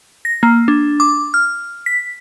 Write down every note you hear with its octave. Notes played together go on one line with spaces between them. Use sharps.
A#6
A#3
D4
D6
F6
B6